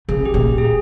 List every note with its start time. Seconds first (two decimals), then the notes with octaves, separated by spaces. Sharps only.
0.09 C#3 G#4
0.26 G4
0.34 A#2
0.58 G#4